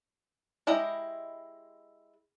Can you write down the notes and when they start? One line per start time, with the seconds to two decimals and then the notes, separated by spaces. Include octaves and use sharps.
0.67 G#3 E4 G4 D#5 A#5